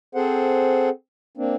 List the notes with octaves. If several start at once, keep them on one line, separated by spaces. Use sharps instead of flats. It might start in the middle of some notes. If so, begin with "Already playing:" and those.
C4 G#4 A4 C5 F#5
A#3 C4 D4